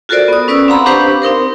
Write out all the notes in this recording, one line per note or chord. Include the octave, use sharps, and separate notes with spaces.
F4 F#4 A4 A#4 C5 D5
B3 D#6
C#4 B4 D5 D#6 E6
C4 C5 F5 F#5 A#5 B5
D4 G4 B4 C5 F5 C#6
C4 D#4 A#4 C5